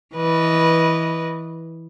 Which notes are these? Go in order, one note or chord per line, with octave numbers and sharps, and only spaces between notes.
E3 B4 D#5